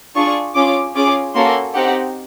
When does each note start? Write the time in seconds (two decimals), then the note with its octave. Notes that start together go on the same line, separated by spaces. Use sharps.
0.15 D4 F4 G#4 C#6
0.55 C#4 F4 G#4 D6
0.95 C#4 F4 G#4 D6
1.35 A#3 C#4 F#4 A4 C6
1.74 C4 D#4 G4 F#5